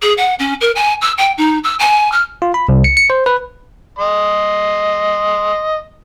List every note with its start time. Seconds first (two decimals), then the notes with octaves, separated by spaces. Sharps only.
0.02 G#4
0.17 F#5
0.39 C#4
0.60 A#4
0.75 G#5
1.01 E6
1.17 G5
1.37 D#4
1.63 E6
1.79 G#5
2.11 F6
2.42 F4
2.54 B5
2.69 C2
2.84 C#7
2.97 C#7
3.10 C5
3.26 B4
3.99 D#5 C6